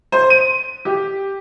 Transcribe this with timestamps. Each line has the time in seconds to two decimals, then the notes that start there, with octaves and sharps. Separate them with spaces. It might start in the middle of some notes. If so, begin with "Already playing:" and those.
0.12 C5
0.30 D#7
0.85 G4